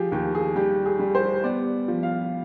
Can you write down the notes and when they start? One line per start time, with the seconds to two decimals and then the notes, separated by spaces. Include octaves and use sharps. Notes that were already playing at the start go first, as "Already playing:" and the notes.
Already playing: F3 G4 G#4
0.12 D#2 G4
0.35 G#4
0.56 G3 G4
0.85 G#4
1.00 G3
1.15 C5
1.44 B3 D5
1.88 F3
2.03 F5